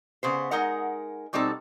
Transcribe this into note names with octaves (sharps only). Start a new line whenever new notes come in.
C#3 B3 C5
G#3 D#4 A#4 F#5
B2 G3 C4 D#4 A4